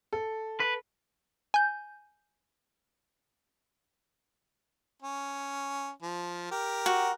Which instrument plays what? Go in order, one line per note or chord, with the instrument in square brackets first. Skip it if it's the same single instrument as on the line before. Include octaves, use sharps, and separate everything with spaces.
[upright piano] A4
[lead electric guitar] B4
[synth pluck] G#5 G6
[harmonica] C#4
F3
G4 A#4
[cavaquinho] F#4